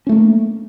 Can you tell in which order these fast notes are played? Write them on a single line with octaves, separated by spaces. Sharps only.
C#4 A3 A#3